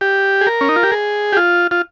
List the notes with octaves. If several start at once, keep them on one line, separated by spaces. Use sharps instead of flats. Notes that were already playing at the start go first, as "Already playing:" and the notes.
G4
G#4
A#4
C#4
D#4
F4
G4
G#4
G4
F4
F4